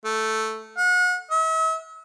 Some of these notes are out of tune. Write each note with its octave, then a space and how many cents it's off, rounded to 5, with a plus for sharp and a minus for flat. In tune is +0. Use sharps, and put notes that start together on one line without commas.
A3 +0
F#5 -35
E5 -40